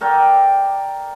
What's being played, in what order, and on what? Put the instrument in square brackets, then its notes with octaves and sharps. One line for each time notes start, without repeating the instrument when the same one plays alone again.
[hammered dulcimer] A4 A#4 D5 G5